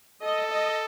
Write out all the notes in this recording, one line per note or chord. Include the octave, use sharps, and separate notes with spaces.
A4 D#5
D#5